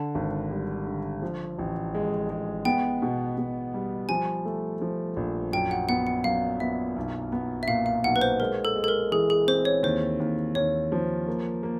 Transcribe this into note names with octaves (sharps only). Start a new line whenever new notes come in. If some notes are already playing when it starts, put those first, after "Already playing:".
Already playing: D3 A5
G#1
G3
D3
F3
A1
G#3
G#3
B3 G5
B2
B2
G3
F3 G#5
A3
F3
A#1
F#2 G5
F#5
B3 F#5
F#5
F#2 F5
B3 E5
B1
B3
E5
A#2 F5
F5
B1 F#5
B4
C5
G#3 A#4
A4
G#3
A4
A#4
E3 G#4
G#4
C4 C5
C#5
D#2 C5
D#2
D#2 C#5
F3
A#3
A#3